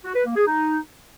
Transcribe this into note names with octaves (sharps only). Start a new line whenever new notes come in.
F#4
B4
A#3
G#4
D#4